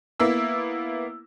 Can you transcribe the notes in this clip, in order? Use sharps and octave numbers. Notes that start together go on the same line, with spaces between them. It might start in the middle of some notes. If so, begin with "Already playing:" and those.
A#3 B3 E4 E6